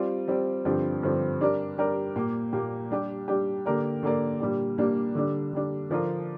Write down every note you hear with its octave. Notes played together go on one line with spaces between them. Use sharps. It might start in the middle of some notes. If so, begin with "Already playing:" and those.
Already playing: G3 C4 F4 D5
G3 C4 F4 D5
G2 D3 F3 C4 G4
G2 D3 F3 C4 G4
G3 D4 G4 A#4 D5
G3 D4 G4 A#4 D5
A#2 A#3 G4
A#2 A#3 G4
G3 D4 G4
G3 D4 G4
D3 A#3 G4 A#4 D5
D3 A#3 G4 A#4 D5
A#2 G3 A#3 D4 G4
A#2 G3 A#3 D4 G4
D3 G3 D4
D3 G3 D4
D3 F3 D4 F4 A#4